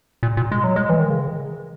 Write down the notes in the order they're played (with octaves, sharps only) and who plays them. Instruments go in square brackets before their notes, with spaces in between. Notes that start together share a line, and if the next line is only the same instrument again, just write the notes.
[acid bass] A#2
A#2
G#3
F#3
G#3
E3
D#3
C#3